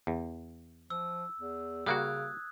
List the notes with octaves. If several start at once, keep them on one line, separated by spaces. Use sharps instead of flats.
E2
F3 E6
E2
C#3 G3 A#3 F#4 D#6 F#6 G#6